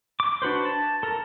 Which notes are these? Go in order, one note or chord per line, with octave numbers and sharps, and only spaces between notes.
D6
D4 F#4 B4 C5
A5
A4 A#4